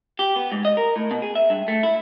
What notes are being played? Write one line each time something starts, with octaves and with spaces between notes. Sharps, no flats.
G4
B3
G#2
D#5
A#4
A2
B2
G#4
E5
G2
A3
E4